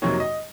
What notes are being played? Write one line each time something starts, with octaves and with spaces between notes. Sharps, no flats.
F2 C3 F#3 A#3 D#4 C#5
D#5